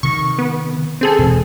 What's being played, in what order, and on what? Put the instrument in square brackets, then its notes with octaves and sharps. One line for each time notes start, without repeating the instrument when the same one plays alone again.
[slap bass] C3 D#3 [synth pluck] C#6
[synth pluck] B3
C4 G#4 A4
[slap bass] E1 B2